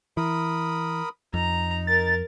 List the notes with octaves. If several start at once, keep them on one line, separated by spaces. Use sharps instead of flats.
E3 A#4 B5 D#6
F2 D#4 A#5
A#4 A6